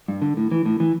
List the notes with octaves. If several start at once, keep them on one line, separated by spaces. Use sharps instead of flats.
G2
D3
A2
E3
A2
E3